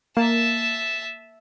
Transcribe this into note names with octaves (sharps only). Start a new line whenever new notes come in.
A#3 E5 A5